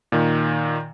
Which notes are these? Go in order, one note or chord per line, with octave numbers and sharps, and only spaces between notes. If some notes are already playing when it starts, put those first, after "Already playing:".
A#2 D#3